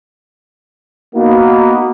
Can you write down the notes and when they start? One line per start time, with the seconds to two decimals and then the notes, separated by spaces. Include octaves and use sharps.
1.15 A#3 B3 D#4 F#4